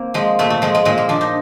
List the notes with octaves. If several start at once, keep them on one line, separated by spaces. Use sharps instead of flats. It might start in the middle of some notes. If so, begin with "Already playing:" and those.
Already playing: A#3 C4
F3 G#3
A#2 A3
A3
F3 G#3
G#3
A#2 G#3
A#3
F3 D4
D#4